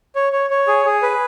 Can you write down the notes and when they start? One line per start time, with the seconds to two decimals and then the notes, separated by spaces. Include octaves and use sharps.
0.15 C#5
0.33 C#5
0.50 C#5
0.67 G#4
0.85 G#4
1.03 B4